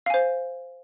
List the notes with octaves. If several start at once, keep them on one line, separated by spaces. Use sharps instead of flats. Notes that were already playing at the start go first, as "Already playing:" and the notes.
C5 F5 G#5